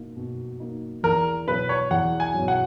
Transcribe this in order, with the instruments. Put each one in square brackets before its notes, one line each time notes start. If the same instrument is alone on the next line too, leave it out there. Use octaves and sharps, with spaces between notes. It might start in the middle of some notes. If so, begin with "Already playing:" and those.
Already playing: [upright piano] B2 A#3 D#4
B2
A#3 D#4
[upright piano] E2 [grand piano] A#4
[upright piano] B2 F#3 [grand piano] B4
[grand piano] C#5
[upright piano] E2 [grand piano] F#5
[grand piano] G#5
[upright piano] F#3
B2
[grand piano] F#5